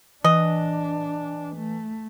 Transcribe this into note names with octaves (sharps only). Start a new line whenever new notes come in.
E3 D4 D#5
A3